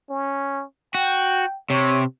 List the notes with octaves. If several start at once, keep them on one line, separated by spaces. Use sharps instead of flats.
C#4
F#4 G5
C3 C#5